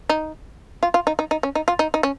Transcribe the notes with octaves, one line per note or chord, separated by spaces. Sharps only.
D#4
F4
F4
D#4
D#4
D#4
C#4
D#4
F4
D#4
D#4
C#4